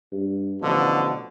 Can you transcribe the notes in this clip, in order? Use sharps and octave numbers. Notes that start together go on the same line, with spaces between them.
G2
A1 B2 D3 F3